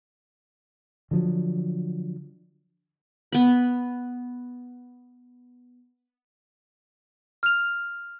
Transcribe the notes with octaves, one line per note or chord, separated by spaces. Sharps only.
D3 F3 F#3
B3 B5
F6 F7